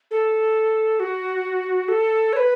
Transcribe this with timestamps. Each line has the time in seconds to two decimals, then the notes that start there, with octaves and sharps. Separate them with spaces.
0.11 A4
1.00 F#4
1.88 A4
2.33 C#5
2.37 B4